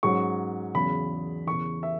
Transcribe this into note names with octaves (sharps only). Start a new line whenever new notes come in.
G#2 F#3 C#4 C#6
E2 C#3 F#3 B5
E2 C#3 E3 C#6
E5